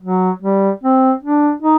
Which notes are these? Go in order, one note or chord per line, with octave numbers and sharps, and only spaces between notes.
F#3
G3
C4
D4
D#4